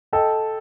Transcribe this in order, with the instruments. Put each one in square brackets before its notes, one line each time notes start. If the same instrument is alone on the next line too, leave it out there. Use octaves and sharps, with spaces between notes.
[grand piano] A4 [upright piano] D#5 G5